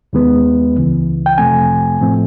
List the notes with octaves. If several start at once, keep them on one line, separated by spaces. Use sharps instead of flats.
D#2 D#3 G#3 B3
C#2 C#3 E3
G5
F2 C3 F3 A3 C4 G#5
A2 F3 A3 C4